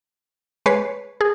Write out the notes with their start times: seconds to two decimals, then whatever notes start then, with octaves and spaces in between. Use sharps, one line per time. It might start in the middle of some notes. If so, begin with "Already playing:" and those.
0.66 G#3 B4 C#5 C7
1.21 G#4